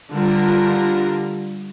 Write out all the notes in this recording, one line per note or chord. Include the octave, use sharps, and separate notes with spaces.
D3 G3 F4 A#4